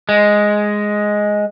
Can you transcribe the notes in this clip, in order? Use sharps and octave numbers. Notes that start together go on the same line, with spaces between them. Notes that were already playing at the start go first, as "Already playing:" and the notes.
G#3